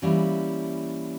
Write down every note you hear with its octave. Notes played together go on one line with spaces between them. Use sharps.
E3 G3 A#3 C#4 E4